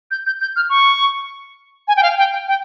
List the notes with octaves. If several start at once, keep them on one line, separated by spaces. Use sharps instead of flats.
G6
G6
G6
F6
C#6
G#5
G5
F5
G5
G5
G5